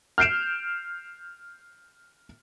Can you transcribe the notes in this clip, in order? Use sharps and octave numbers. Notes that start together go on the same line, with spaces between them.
F6 G6 C7 D7 E7